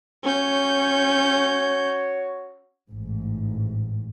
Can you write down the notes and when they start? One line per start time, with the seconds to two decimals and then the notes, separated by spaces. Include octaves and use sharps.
0.24 C#4 F#4 C#5 G6
2.91 A1 G#2